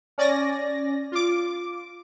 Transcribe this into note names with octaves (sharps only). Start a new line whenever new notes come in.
C#4 D5 G#5 A#6
F4 D6